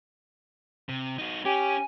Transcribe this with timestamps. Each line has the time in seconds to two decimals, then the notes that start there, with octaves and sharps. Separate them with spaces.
0.89 C3
1.19 D#4 F#4
1.45 C#4 G4 G#5